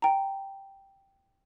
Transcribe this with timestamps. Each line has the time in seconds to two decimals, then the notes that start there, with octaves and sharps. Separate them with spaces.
0.02 G5 A#5